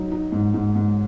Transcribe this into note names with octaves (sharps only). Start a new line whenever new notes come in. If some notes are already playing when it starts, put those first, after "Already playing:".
Already playing: F#3 D#4
D#4
G#2
G#2
G#2